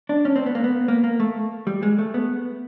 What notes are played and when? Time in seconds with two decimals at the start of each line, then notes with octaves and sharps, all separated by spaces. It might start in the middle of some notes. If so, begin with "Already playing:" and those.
0.09 D4
0.25 C#4
0.36 C4
0.46 B3
0.55 A#3
0.64 B3
0.88 A#3
1.04 A#3
1.20 A3
1.67 G3
1.83 G#3
1.99 A3
2.14 B3